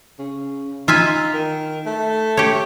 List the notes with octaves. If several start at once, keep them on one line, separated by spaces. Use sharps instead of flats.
C#3
D#4 F4 E5 G#5
D#3
A3
G4 C#5